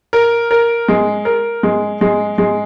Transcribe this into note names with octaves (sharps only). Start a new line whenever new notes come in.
A#4
A#4
G#3
A#4
G#3
G#3
G#3